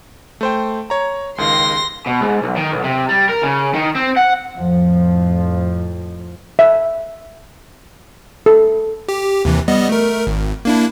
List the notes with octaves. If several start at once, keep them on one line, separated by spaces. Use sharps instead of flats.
A3 C5 G5
C#5 A#5
C#2 D#3 F5 C6 A#6
B2
G#2
B1
D#3
B1
C3
G3
A#4
C#3
D#3
C4
F#5
F2 A2 F3
E5
A4
G4
D#2 C3 E3
G3 B3 D#5
A3 A#4
G#1
A#3 D4 E4